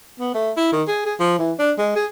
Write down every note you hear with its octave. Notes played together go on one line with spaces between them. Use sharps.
B3
A3
E4
D#3
G#4
G#4
F3
E3
D4
G#3
G#4